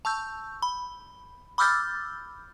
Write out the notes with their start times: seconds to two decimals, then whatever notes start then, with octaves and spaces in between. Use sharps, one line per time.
0.05 A5 C#6 E6 G6
0.62 B5
1.58 B5 D6 E6 F6 G6 A6